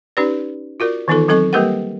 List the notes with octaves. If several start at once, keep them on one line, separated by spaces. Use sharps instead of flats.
C#4 D#4 G4 B4 D5
F4 F#4 A#4 D5
D#3 E3 B3 D#4 F4 A4
F#3 C4 A4 D#5 C#6
G3 A#3 G4 A#4 B4 F#5